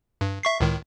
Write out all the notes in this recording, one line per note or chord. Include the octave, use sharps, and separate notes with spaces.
G2
E5 C#6 C7
C#2 A2 D#3